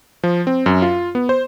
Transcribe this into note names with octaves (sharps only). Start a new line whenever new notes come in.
F3
C4
F#2
F4
B3
C5